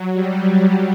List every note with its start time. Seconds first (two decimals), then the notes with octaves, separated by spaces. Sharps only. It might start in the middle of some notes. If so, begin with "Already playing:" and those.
Already playing: F#3
0.13 G3